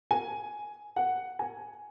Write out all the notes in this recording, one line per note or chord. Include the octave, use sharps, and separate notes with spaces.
G#5
F#5
G#5